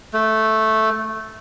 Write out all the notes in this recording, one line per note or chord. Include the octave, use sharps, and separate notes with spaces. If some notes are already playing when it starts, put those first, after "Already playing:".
A3